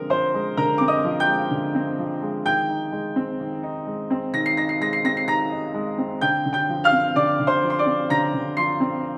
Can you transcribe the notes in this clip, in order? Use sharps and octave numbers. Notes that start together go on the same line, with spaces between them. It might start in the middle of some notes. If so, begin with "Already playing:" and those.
Already playing: D3 F3 G#3 C4 A#4
F3 C5 C6
G#3
D3 A#4 A#5
C4 D6
D#5 D#6
F3
G5 G6
G#3
D3
C4
F3
G#3
D#3 G5 G6
D#4
G#3
C4
D#3
D#4
G#3
C4
D#3 A#6
C7
D#4 A#6
C7
G#3 A#6
C7
C4 A#6
C7
D#3 A#5 A#6
D#4
G#3
C4
D3 G5 G6
D3
G5 G6
F3
F5 F6
C4
D3 D5 D6
D3
C5 C6
F3
C6
D5 D6
C4
D3 A#5 A#6
D3
F3 C6 C7
C4